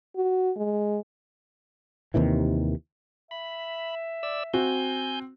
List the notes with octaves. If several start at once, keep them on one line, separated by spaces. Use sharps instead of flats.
F#4
G#3
D#2 C3 D#3 E3
E5 B5
D5 E6
C4 F#4 G#5 G6